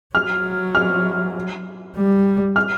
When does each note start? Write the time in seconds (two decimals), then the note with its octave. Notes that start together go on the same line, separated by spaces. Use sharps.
0.15 F#3 F6
0.75 F6
1.96 G3
2.56 F6